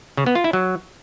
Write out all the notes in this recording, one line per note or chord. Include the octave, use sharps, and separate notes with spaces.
C#3
B3
F4
E4
F#3